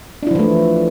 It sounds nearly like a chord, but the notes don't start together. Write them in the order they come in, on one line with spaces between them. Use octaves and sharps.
D4 E4 F3 E3 A3